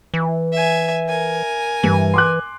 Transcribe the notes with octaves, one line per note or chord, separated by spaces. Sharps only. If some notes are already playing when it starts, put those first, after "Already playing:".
E3
E5 G#5
A#4 G#5
G2 E3
C6 D6 F#6